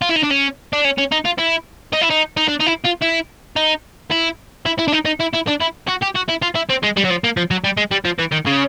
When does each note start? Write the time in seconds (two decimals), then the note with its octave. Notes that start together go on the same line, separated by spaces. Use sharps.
0.02 F4
0.09 E4
0.16 D#4
0.23 D4
0.30 C#4
0.73 D4
0.85 C#4
0.98 C#4
1.12 D#4
1.25 F4
1.39 E4
1.93 D#4
2.02 E4
2.10 D#4
2.37 D#4
2.48 D4
2.60 D#4
2.66 E4
2.84 F4
3.02 E4
3.56 D#4
4.11 E4
4.66 E4
4.79 E4
4.88 D4
4.92 D#4
5.05 D#4
5.20 E4
5.33 E4
5.47 D4
5.60 E4
5.87 F#4
6.02 G4
6.15 F#4
6.29 E4
6.42 F4
6.55 E4
6.69 C4
6.83 G#3
6.96 G3
7.04 F#3
7.10 F3
7.24 A#3
7.37 F3
7.51 F#3
7.64 G3
7.77 G#3
7.91 G3
8.05 F3
8.19 E3
8.32 D#3
8.46 C#3